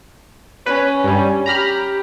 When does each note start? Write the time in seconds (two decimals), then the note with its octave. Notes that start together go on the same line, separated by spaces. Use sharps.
0.66 C#4 B4
1.04 G2 G3
1.46 G4 A#5 B5 F6